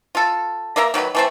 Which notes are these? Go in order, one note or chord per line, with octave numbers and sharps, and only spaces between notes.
F4 A4
A#3 A#4 E5 A#5
D#3 F#3 F#4 B4
E3 A3 C4